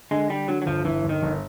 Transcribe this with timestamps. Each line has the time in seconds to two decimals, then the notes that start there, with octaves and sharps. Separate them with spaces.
0.11 D3 G#3
0.30 D3 G3
0.48 D3 F#3
0.62 F#3
0.66 G1 F3
0.85 G1 E3
1.04 G1
1.09 D#3
1.22 G1